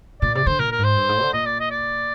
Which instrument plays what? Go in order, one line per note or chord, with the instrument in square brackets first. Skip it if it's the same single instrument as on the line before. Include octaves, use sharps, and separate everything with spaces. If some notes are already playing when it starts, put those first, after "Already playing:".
[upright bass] A#2 [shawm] D5
[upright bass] C3 [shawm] D5
[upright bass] D3 [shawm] C5
[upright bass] A#2 [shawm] A#4
[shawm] A#4
[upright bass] G#2
[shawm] C5
[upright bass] G2
G#2
D3
[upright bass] A#2 [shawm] D#5
[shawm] D5
D#5
D5